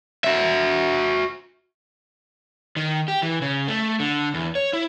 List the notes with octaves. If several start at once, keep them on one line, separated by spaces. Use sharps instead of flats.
F#4 E5
D#3
G4
E3
C#3
A3
D3
E2
C#5
E4